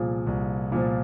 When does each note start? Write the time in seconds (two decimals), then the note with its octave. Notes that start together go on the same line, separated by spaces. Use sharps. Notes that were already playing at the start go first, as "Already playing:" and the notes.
Already playing: C2 A#2 F3 G#4
0.27 C2
0.72 A#2 F3